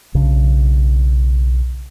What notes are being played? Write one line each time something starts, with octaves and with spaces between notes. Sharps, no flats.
B1 C#3 D4